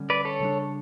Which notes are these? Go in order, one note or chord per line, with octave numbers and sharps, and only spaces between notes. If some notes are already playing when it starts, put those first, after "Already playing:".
Already playing: D3 G3 C#4
B4 D5
A4 C#5
C#3 G3 D4